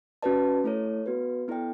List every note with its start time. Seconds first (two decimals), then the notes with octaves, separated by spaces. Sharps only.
0.22 C#4 F#4 B4 D5 A5
0.64 A3 E4 A4 C#5
1.06 B3 F#4 B4
1.48 B3 E4 A4 D5 G5